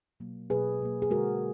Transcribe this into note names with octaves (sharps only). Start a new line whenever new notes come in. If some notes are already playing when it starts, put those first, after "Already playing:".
B2 F#3 A#3
B2 F#3 A#3 G#4 B4
B2 F#3 A#3
G#4
D3 G#3 F#4 A#4